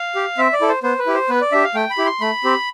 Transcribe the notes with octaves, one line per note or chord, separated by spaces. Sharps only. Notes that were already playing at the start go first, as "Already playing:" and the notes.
Already playing: F5
G4
C4 E5
D5
E4 A4
C5
B3 C5
B4
E4 G4
C5
B3 B4
D5
D4 G4 E5
F5
A3 G5
B5
E4 G4
C6
A3 B5
C4 G4